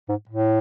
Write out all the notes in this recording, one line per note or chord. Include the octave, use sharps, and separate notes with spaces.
G#2
A2